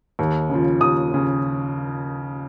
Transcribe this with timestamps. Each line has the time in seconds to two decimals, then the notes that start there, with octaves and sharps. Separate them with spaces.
0.19 D#2
0.50 C#3 F3
0.80 D#2 D#6
1.12 C#3 F3